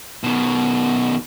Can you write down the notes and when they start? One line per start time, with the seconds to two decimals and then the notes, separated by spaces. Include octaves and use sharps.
0.24 B2 D#3